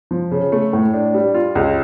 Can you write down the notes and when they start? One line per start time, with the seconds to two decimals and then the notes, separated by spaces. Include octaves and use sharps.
0.11 F3
0.31 C#3
0.52 A3
0.73 A2
0.94 D4
1.14 G3
1.34 F4
1.55 C#2